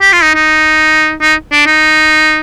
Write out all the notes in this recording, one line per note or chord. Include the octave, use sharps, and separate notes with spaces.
G4
F4
D#4
D#4
D#4
D4
D#4